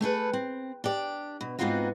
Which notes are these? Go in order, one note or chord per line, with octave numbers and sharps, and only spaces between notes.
A3 G#4 A4 B4
C4
D4 G4 D5
B2
G#2 B3 C4 D#4 F4 F#4